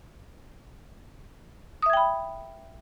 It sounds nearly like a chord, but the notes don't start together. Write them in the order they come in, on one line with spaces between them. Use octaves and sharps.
D#6 E5 G#6 G5 B5